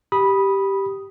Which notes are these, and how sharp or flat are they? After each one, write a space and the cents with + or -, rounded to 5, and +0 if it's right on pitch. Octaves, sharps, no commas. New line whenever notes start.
G4 -5 B5 -10 D#6 +0